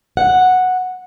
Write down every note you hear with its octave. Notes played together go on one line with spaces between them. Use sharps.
F#5